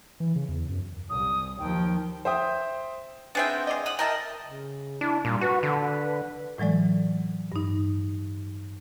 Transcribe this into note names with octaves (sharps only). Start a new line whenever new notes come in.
E3
C#3
E2
F#2
C2 D#6
D#2 F3 G5
C5 E5 G5 D#6
B3 C4 D4 G#4 E5 G5
G#3 D5 D#5
F#5 D#6
A#4 D#5 E5 G5 A5
C#3
D4 E4
A#2 G3
F#4 B4
D3
A2 E3 F#3 G#3 D5
G2 D#4